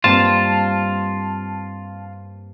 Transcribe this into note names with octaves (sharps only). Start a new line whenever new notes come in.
G2 A#3 C4 F4 A5